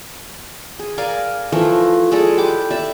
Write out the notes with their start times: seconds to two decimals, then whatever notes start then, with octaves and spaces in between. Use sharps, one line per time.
0.79 G#4
0.98 A#4 D5 F5 G#5
1.52 E3 F3 A3 A#4
2.11 G#3 G#4 A4 D5
2.38 G4 B4 D6
2.71 D5 E5 A5